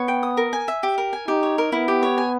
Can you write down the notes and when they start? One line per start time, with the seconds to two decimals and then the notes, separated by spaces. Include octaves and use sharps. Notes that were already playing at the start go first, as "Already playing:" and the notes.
Already playing: B3 C#5
0.08 G5
0.23 D#6
0.37 A#4
0.53 G#5
0.68 E5
0.83 G4
0.98 A#4
1.13 G#5
1.28 D#4 G4
1.43 C#5
1.58 A#4
1.72 B3 E4
1.88 G4
2.03 C#5
2.18 G#5